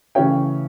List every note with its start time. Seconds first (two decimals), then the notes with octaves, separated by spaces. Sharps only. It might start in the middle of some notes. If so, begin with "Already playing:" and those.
0.15 C#3 E3 A3 C#4 G5